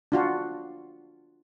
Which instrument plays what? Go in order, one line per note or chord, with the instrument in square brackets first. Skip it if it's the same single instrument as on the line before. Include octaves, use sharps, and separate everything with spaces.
[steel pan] D4 F4 F#4